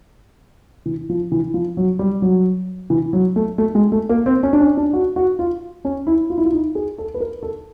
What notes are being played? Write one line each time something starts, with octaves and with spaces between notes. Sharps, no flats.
E3
F3
E3
F3
F#3
G3
F#3
E3
F#3
A3
A3
G#3
A3
A#3
C4
C#4
D4
C#4
D4
F#4
F#4
F4
C#4
E4
F4
E4
F4
D#4
G#4
A4
B4
A#4
A4